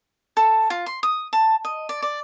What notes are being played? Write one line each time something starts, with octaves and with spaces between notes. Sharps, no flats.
A4
F4
C6
D#6
A5
D#5
D5
D5